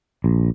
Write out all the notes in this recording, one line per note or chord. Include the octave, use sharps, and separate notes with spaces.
A#1